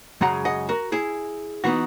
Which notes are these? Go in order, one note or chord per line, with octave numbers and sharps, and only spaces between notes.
F#2 C#3 G#3 F#5 A#5
D#5 F#5
F#4 A#4
E4 G#4
E3 B3 D#4 F#4